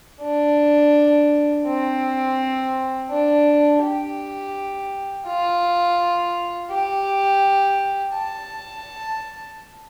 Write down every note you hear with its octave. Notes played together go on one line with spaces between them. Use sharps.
D4
C4
D4
G4
F4
G4
A5